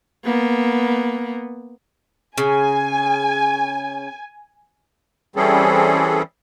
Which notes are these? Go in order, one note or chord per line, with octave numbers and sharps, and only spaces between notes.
A#3 B3
C#3 G#5
E3 G3 C4 C#4 G#4 A4